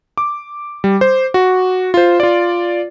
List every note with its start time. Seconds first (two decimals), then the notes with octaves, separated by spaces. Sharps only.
0.18 D6
0.84 G3
1.01 C5
1.34 F#4
1.94 F4 C5
2.20 F4 D5